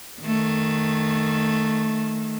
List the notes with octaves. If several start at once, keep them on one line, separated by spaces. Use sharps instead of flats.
D#3 A3